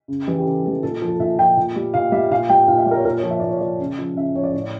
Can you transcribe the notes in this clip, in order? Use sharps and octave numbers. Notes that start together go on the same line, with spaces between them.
C#3
E3 G3
G4
C#3 A4
E3 G3 A4
A#2 A4
F3
A4
A#2 E5
F3 G5
A#2
G3
A#2 F5
G3 E5
A#2 F5
G3 G5
A#2 F5
E5
G3 D5
A#4
C#5
A#2 A#4
C#5
F3
E5
A#2 D5
C#5
F3 D5
C#3
F3
C#3 E5
F3 C#5
D5
A2 C#5
D5